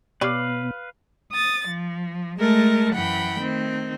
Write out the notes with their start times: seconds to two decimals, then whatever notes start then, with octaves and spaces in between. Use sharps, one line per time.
0.21 B2 B3 G4 B4 C#5 D5 F5
1.31 D#6 A6
1.68 F3
2.40 G#3 A3 A#4 A5
2.94 F#2 E3 F#5 G5 B5
3.38 D#3 A3 C4